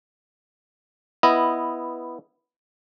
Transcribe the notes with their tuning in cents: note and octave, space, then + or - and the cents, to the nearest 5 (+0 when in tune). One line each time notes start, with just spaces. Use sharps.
B3 +0 E4 +5 D#5 +0